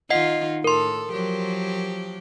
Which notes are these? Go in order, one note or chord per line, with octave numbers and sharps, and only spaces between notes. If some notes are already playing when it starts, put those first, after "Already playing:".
D#3 D#4 F4 D#5 F#5 C7
A2 A4 A#4 C6
F3 F#3 G4